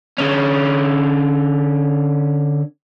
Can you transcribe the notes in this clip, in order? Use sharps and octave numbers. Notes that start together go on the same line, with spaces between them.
D3 C#4